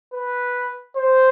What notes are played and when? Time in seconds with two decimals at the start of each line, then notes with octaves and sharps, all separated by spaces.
0.13 B4
0.97 C5